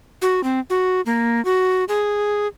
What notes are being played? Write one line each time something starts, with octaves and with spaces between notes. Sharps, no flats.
F#4
C4
F#4
A#3
F#4
G#4